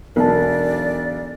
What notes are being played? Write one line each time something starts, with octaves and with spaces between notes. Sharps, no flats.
E1 B1 A#4 D5 A5